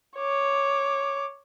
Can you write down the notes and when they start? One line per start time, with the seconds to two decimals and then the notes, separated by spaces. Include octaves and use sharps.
0.17 C#5 D6